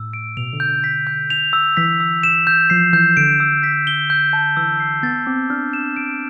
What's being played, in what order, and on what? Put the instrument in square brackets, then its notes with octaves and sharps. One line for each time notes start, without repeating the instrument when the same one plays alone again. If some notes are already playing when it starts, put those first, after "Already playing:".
Already playing: [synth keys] A2 [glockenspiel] E6
[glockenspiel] D7
[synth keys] B2 [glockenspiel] F7
[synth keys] D3
[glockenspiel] G6
[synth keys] D3
[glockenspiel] B6
G6
F7
E6
[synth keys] E3 [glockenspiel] B6
[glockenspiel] E6
E7
G6
[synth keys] F3 [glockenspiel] C7
[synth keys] E3 [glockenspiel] G6
[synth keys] D3 [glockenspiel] D7
[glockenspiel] E6
B6
G7
G6
A5
[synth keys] E3 [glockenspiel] E6
[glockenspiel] C7
[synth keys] B3 [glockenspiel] A6
[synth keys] C4 [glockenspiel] D6
[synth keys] D4 [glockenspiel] F6
[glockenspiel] E7
D7